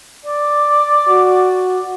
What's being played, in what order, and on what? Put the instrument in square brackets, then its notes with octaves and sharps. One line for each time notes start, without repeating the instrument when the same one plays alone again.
[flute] D5
[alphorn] F#4